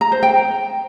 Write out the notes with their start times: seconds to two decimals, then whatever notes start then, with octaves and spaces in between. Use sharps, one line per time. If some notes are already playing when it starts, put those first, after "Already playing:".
0.01 A#5
0.12 C5
0.23 G5